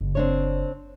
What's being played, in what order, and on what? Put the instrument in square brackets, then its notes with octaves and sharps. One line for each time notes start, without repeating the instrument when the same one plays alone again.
[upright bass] F#1
[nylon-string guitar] C4 D4 C#5